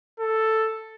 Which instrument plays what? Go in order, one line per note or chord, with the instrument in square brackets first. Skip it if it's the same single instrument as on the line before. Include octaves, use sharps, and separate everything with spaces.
[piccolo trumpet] A4